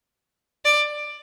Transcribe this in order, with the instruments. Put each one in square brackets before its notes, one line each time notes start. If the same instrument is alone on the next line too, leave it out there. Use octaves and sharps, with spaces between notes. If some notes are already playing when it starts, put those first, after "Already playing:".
[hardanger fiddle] D5